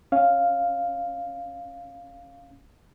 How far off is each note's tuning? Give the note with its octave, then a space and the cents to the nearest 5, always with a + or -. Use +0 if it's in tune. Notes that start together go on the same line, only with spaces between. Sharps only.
C#4 +0 F5 +0